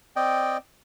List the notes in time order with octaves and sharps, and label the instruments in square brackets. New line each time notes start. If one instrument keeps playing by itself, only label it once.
[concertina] C4 D5 D#5 G5